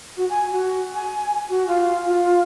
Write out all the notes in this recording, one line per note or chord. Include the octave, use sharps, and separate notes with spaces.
F#4
G#5
F#4
G#5
F#4
F4
F4